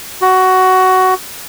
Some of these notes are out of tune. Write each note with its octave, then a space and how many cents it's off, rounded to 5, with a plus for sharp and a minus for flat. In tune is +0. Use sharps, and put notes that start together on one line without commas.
F#4 +15